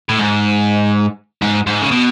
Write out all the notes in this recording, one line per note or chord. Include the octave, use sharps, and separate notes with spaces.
A2
G#2
G#2
G#2
C#3
B2